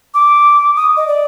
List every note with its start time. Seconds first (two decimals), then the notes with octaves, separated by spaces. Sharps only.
0.14 D6
0.76 D#6
0.97 D#5
1.07 D5